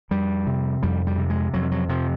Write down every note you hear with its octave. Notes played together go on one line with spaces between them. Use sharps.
F2 G3
C3
F2 G3
G3
C3
G#3
F2 F#3
F#3
C3 F3